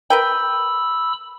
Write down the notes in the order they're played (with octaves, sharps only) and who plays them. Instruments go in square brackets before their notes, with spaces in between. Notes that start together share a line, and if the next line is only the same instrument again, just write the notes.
[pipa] A#4 B4 G5 [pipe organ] B5 E6